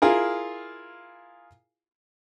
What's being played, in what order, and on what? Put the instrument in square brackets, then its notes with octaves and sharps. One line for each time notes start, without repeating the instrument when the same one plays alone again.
[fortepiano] E4 F4 G#4 A#4